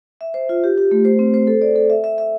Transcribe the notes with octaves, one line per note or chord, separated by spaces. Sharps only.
E5
C5
F4
G4
G4
A3
C5
C4
C5
A4
D5
A4
E5
E5
E5